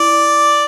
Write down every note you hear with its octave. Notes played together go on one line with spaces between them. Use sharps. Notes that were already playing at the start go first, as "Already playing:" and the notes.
Already playing: E4 D5